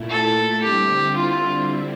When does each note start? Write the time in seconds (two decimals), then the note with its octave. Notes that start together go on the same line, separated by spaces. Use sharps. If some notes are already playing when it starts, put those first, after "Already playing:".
Already playing: A#2 A3 E4
0.10 A4
0.62 D3 G3 C4 E4 G4
1.16 F4